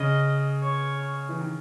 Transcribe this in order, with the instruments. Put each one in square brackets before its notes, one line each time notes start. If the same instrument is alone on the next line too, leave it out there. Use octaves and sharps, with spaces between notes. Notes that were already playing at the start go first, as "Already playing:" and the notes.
Already playing: [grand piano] C#3 [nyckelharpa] D#5
[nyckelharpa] C#5
[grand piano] E3
D#3